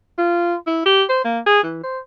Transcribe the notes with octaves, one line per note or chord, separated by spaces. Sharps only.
F4
E4
G4
C5
A#3
G#4
E3
C5